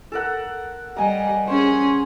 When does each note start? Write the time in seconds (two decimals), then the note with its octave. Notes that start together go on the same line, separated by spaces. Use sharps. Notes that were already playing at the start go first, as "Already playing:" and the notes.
0.12 A4 A#4 F#5
0.97 G3 D#5 G#5 A#5
1.48 C#4 G#4 C5